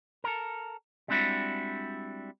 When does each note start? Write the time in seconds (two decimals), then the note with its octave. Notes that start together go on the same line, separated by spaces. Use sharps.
0.24 A4 A#4
1.08 G3 G#3 C4 D4 E4 F#4